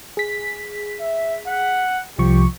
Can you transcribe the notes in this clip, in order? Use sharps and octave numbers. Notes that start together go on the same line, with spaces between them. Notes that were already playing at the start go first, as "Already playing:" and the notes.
G#4 B6
E5
F#5
C2 F3 G4 C#6